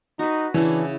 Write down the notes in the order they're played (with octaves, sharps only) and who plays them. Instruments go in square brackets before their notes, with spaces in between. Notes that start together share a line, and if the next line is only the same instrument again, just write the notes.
[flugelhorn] D#4 [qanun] F#4 B4
[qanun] C#3 E4 F#5 [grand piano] E3 [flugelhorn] D4